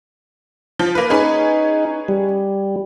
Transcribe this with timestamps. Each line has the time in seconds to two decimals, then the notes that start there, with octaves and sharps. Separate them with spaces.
0.79 F3
0.95 A#3 B4
1.10 C#4 D#4 G#4 B4
2.08 G3